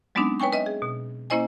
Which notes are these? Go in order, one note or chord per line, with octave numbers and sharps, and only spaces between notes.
F#3 G#3 B3 C4 D4 D#4
B4 C#5 G5 G#5 C#6
B4 D#5 E5
G#4
B2
A#3 C#4 E4 C5 D#5 G#5